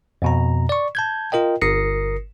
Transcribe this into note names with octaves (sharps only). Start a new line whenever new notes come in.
F2 B2 A#5
D5 C#6
A5 G6 G#6
F4 A#4 D#5 G5
G1 A#4 D#6 A#6 C7 C#7